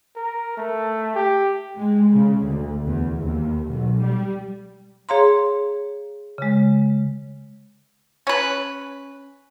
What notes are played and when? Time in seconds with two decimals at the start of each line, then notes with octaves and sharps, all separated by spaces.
0.16 A#4
0.58 A3
1.16 G4
1.77 G#3
2.13 C#3
2.43 D2
2.85 E2
3.20 D#2
3.66 B1
4.02 G3
5.09 G#4 C#5 F5 A#5 C6
6.38 C#3 G#3
8.27 C#4 B4